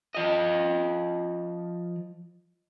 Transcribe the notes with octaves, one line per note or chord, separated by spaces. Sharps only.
F3 D#5